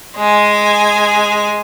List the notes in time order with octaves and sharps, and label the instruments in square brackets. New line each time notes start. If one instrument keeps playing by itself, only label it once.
[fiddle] G#3 G#5